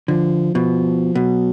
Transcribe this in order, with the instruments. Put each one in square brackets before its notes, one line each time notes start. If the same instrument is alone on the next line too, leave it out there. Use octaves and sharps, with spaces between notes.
[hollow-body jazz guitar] D3 [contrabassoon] F3
[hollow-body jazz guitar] B2 [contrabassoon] F3
[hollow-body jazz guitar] B2 [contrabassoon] F#3